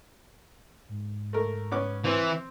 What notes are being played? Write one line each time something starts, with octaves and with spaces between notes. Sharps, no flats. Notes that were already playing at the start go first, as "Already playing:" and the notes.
G#2
A3 A#4
B3 C#4 D6
E3 C4